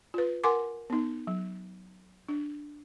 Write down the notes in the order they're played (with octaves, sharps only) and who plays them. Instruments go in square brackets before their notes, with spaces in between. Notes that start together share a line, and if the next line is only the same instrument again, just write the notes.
[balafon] F4 B4
A#4 F#5 G#5 C6 D6
B3 D#4
F#3
D4